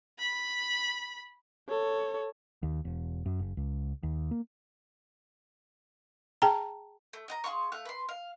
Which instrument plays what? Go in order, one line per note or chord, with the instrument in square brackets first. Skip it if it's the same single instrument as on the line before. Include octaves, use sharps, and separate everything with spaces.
[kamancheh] B5
[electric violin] A4 C#5
[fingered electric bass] D#2
E1
F#2
F#1
C#2
D#2
A#3
[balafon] G#4 G5 A5 A#5
[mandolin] A3
D#5 F#5 A#5
G#4 F5 C6 C#6
A3 F5 F#6
B4 C6
F5